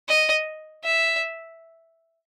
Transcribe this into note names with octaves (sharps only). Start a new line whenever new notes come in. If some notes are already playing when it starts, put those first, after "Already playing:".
D#5
E5